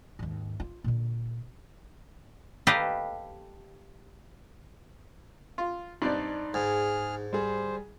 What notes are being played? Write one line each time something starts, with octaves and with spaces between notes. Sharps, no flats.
D#2 G#2
F4
A#2 D3
G4 A4 B4 D#5 F5
F4
G2 C4 D#4 D5 A5 F#6
G#2 G#4 F6
G3 G#4 C5